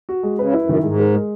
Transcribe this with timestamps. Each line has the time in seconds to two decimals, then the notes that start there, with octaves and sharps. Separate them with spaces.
0.09 F#4
0.23 G#3
0.38 C#3 B4
0.54 E4
0.62 F#2
0.69 D#3
0.83 G#2 G#3
0.99 A#4
1.14 G#3